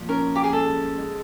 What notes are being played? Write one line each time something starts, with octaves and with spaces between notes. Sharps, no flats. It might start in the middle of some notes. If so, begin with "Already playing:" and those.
Already playing: A#2 F3
C#4 A#4
G4
G#4
G#3 A4
G#3